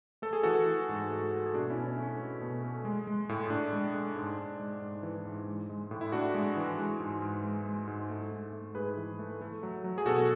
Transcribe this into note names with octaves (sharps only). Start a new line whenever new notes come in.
A3 A4
G#4
E3 F#4 A4
E3
G#2
A3
A3
G#4
B2 D4 F#4
C#4 E4
B2
C#4
A3 C#4
A3
B2
A3
G#3
G#3
A2
A2 D4
G#3
G#3
G#2
G#2
G#3
G#2
E3
G#2
G#3
G#3
A2
E4
A2 D4 F#4
G#3
E3
G#3
G#2
G#2
G#3
G#3
G#2
A3
G#2
A3
G#2 G#4 B4
E3
A3
A3
F#3
F#3
G#4
B2 F#4 A4